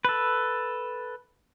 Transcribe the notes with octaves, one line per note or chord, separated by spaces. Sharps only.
A4 B4